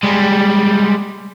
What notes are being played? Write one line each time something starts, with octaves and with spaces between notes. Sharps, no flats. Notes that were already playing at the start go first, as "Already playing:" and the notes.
G3 G#3